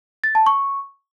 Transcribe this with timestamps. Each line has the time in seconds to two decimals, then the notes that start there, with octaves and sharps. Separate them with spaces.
0.24 A6
0.35 A5
0.46 C#6